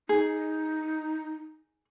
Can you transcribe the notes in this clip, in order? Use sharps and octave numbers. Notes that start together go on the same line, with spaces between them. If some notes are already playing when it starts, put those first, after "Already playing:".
D#4 G#4